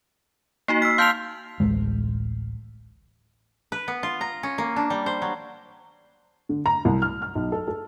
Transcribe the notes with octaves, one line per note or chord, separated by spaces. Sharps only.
A#3 D#4 F#4 C7
E6 F6 B6
F5 A5 C6 F6 G6 F7
D1 A1 A2 G#3
B4
B3
F4
A#5
C#4
A#3
D4
G3
C5
F#3
D3
A#5
C2
F6
F6
B1
A4
A4